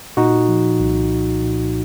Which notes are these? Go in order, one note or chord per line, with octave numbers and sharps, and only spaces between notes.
A#2 D#4 F#4
F3
C2
C2
A#2